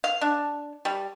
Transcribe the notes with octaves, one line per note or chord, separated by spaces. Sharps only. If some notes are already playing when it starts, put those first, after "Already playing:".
F5
D4
G3